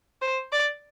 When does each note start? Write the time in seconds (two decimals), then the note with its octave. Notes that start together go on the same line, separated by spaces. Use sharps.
0.22 C5
0.52 D5